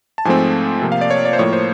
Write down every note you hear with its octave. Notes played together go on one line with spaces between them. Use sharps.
A5
G#2 F3 A3 C4 G#5
C3 F3 A#3
F5
D5
C#5
D5
C5
A2 F3 A#3 C#5
C5